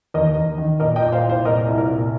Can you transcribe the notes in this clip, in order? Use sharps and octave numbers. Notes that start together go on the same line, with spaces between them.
D#2 A#4 D#5
D#2
D#3
A#2 A#4 D#5
D#5 G5
A#2
C5 F5
C2
C5 F5
A#2 A#4 D#5
C2
A#4
A#2